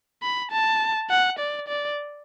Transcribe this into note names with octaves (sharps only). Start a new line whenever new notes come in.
B5
A5
F#5
D5
D5